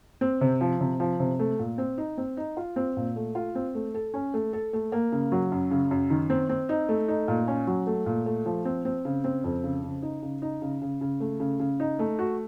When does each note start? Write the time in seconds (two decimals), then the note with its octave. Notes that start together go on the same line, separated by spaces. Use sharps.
0.21 C4
0.41 C3
0.61 F3
0.81 C3
1.00 F3
1.20 C3
1.39 A3
1.59 A#2
1.78 C4
1.98 D#4
2.18 C4
2.37 D#4
2.57 F4
2.76 C4
2.97 A#2
3.16 A3
3.35 F4
3.55 C4
3.75 A3
3.94 A4
4.14 C#4
4.34 A3
4.53 A4
4.73 A3
4.92 A#3
5.12 C#3
5.32 F#3
5.52 F#2
5.71 C#3
5.91 F#2
6.10 D#3
6.30 C4
6.49 C4
6.69 D#4
6.89 A3
7.08 D#4
7.28 A#2
7.47 C#4
7.67 F#3
7.87 A3
8.06 A#2
8.26 A3
8.46 F3
8.65 C4
8.85 C4
9.05 C#3
9.24 C4
9.44 F2
9.63 C#3
9.83 C#3
10.02 D#4
10.22 C#3
10.42 D#4
10.62 C#3
10.81 C#3
11.01 C#3
11.20 A3
11.40 C#3
11.60 C#3
11.80 D#4
11.99 A3
12.19 F#4